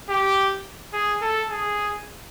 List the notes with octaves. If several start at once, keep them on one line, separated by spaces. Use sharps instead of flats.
G4
G#4
A4
G#4